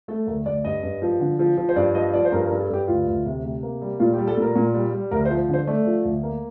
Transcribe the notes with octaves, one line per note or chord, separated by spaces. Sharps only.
A3 A4
D2 A#4
D2 D5
G2 D#5
G2
F3
D3
F3
F3
C5
G2 D5
F3 D#5
F3 D5
C5
G2 A#4
A#4
G2
A4
G2 G4
D2 F4
D2
C3
C3
A#3
G3
A#2 F4
G4
G3
A4
A#2 A#4
A#2
G3
G3
D2 A#4
C5
F3
D3 C5
A3 D5
F3
D2
A#3